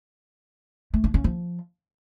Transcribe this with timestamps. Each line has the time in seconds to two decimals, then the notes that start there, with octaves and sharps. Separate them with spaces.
0.94 A3
1.04 D4
1.14 C#4
1.24 F3